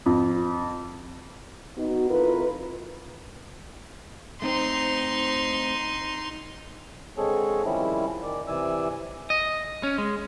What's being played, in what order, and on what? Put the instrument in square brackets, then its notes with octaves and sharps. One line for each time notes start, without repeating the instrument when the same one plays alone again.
[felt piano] F2
[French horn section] B3 D#4 F#4
F2 E4 F4 A#4 B4
[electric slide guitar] A3 C4 C5 [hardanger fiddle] D#4 C6
[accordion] D3 G#3 C4 G#4 A4 C#5
D#3 F3 G3 C4 C#4 E4
D#3 D5
C3 E3 D5 G#5 E6
[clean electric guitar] D#5
C#4
G#3